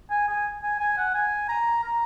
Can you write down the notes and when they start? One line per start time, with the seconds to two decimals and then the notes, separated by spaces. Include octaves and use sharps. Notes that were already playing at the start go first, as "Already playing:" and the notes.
0.11 G#5
0.28 G#5
0.63 G#5
0.80 G#5
0.98 F#5
1.14 G#5
1.49 A#5
1.83 A#5